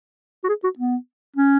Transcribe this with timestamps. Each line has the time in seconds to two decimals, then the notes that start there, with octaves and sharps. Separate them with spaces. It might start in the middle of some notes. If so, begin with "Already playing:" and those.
0.44 F#4
0.49 G#4
0.64 F#4
0.79 B3
1.36 C#4